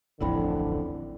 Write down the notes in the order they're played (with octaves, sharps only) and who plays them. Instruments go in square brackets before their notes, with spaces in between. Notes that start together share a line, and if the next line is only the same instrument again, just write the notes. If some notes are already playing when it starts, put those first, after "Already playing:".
[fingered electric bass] D1 A1 F2 [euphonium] D3 [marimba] E4 G5 B5